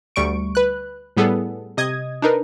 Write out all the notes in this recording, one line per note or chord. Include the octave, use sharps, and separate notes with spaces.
D2 G3 C#6 D7
B4 F#6
A2 G3 B3 G#4 A4
C3 D#5 D#6 G#6
D4 D#4 A#4 B4